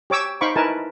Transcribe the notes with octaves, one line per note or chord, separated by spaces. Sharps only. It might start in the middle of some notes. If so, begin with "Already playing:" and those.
G4 C#5 D6 E6
D#4 C5 F5 B5 C#6 D6
D#4 E4 A#4 B4 G#5 A5